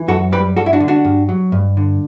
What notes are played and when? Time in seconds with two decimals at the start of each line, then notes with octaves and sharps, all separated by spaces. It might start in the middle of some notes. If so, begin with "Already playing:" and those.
Already playing: E3
0.08 F#2 F#4 A4
0.32 G3 G4 B4
0.56 G2 F#4 A4
0.66 E4
0.73 D4 F#4
0.80 D3
0.88 D4 F#4
1.05 G2
1.29 F#3
1.52 G2
1.77 D3